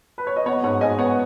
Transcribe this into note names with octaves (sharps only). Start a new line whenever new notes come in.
B4
C#5
D#5
B3 C#5 F#5
G#2 C#5 F#5
G#2 D#5 G#5
B3 C#5 F#5